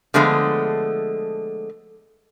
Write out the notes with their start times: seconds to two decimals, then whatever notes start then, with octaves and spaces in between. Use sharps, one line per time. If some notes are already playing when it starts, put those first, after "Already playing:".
0.14 D3 F3 G#3 A3 B3 G#4